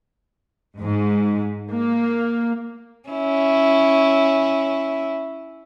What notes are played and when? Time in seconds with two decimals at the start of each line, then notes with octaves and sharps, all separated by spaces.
0.78 G#2
1.70 A#3
3.09 C#4 E4